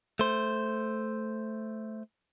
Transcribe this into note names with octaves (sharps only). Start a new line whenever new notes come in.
A3 C5